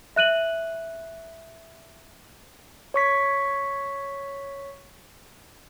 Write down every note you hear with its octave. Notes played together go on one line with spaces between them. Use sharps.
E5 F#6 D#7 F#7
C#5 C#6 B6